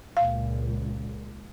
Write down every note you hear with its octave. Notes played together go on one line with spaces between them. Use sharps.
C#2 A#2 F5